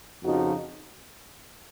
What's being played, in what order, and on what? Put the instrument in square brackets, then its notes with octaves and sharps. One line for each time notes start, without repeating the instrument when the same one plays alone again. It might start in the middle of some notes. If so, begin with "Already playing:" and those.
[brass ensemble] F2 C#3 F3 D#4 F#4